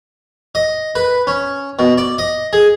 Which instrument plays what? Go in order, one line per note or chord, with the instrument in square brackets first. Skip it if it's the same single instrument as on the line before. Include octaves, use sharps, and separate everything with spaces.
[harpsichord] D#5
B4
C#4
B2
D5
D#5
G#4